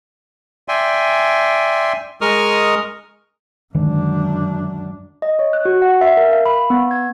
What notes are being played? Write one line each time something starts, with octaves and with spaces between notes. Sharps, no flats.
D5 E5 G5 G#5 C6
G#3 A#4 D#5 C#6 D#6 F6
F#2 D3 D#3 G#3 D4
D#5
C#5
F#6
F#4
F#5
E5
A#4
F5
B5
B3
G#6